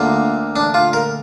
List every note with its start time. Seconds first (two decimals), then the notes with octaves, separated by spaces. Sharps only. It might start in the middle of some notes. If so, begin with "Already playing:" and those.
Already playing: D2 D3 A#3 F4
0.56 D4
0.74 F4
0.93 A#4